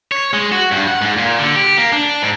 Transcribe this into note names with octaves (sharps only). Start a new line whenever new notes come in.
C#5
G#3
F#4
G2
F#5
G#2
A#2
D3
G4
A#3
D4
G#2